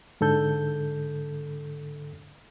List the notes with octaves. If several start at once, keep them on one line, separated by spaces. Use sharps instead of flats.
G#2 D3 A4 G6